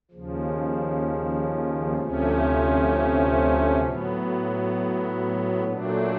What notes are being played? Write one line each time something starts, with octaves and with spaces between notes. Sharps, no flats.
D#2 C#3 F3
D2 C3 F3 A3 C#4
A2 F#3 B3
A#2 F#3 A3 D4